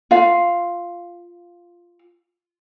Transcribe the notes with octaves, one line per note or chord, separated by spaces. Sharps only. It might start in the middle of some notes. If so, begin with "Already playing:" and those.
F4 F5